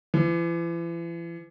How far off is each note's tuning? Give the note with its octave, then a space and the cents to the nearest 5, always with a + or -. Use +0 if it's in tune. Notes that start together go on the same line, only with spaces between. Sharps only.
E3 +40